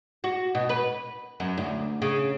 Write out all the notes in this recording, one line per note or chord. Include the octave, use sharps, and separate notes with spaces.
F#4
B2
B4
F#2
D2
C#3